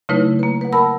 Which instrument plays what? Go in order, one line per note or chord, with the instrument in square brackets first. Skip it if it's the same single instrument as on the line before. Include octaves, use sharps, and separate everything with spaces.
[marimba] C#3 F#3 A3 D#4 E4 B4
A#3 B4
B4 F#5
A#4 F#5 A5 B5 E6